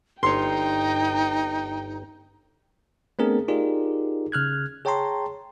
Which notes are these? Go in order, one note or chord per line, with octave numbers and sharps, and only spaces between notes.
G1 D#4 C#5 G5 C6
A3 B3 C4 D4 G#4 A#4
D#4 F4 G4 G#4 A#4 D5
C#3 F6 F#6 G#6
G#4 C#5 G5 A5 A#5 C6